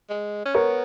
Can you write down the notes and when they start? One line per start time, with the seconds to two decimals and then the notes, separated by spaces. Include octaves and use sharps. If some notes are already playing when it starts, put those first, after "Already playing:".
0.10 G#3
0.46 C#4
0.54 B3 A#4 C#5